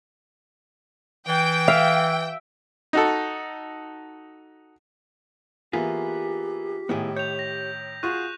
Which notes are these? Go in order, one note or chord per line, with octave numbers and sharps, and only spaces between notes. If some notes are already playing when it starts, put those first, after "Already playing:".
E3 G5
E5 F5
D#4 F#4 A4
E3 A#3 B3 F4 G4 G#4 B6
A2 D#3 B3 E4 G#4
C#5 G6 F7
A#6
F4 F#4 G#4 C#6 F#6 D#7